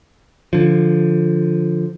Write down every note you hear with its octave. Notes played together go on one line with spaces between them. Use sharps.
D3 F3